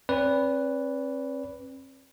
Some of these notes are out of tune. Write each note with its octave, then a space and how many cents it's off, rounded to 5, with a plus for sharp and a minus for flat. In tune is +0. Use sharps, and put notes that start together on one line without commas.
C4 +40 B4 +0 D5 -35